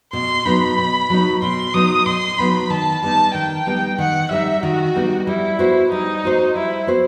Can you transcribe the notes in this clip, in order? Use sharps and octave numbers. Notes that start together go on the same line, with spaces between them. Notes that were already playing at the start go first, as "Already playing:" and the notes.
B2 C6
F#3 B3 D#4 B5
B2
F#3 B3 D#4
B2 C6
F#3 B3 D#4 D#6
B2 C6
F#3 B3 D#4 B5
D#3 A5
G3 B3 D#4 A5
D#3 G5
G3 B3 D#4
D#3 F#5
G3 B3 D#4 E5
D#3 F#4
G3 B3 D#4
G3 E4
B3 F#4 C5
G3 D#4
B3 F#4 C5
G3 E4
B3 F#4 C5